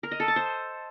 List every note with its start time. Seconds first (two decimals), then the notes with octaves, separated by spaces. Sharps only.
0.03 A#4
0.11 D#5
0.20 A4
0.28 A5
0.36 C5